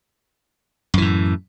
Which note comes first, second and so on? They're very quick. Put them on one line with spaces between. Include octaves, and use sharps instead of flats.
F#2 E3 A2